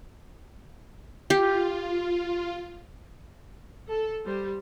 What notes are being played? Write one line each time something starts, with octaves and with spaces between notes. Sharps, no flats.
F4 G4
A4
G3 C5